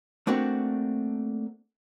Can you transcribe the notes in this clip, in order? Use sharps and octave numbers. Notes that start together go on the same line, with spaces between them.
A3 A#3 C4 D4 F#4